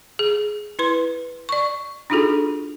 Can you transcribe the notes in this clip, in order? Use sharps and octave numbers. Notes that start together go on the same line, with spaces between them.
G#4
E4 B4 C6
D5 C#6
D4 D#4 F4 F#4 G#4 A4